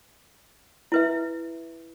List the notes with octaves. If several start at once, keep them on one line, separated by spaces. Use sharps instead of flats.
E4 B4 E5